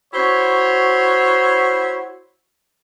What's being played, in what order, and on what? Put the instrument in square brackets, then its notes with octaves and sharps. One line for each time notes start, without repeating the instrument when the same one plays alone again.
[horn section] E4 F#4 C5 C#5